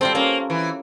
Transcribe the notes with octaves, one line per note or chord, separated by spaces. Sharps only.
G3 C4 F4 A4
A#3 C#4
E3